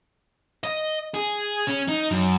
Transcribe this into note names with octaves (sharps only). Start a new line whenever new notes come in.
D#5
G#4
C#4
D#4
F#2